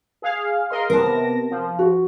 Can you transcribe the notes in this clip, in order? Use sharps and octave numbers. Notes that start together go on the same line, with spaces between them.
G#4 F5
A#4 D#5 C6
C3 B3 A#4 A5 A#6
F3
F#4